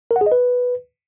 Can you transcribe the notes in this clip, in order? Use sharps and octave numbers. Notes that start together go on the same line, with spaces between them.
A#4
F#5
G#4
D#5
B4